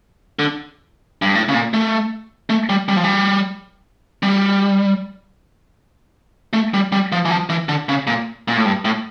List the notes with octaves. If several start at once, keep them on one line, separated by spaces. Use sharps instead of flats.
D3
G2
A2
C#3
A#2
A3
A3
G3
G3
F3
G3
G3
A3
G3
G3
F3
E3
F3
E3
D3
C#3
A#2
A#2
A2
G2
A2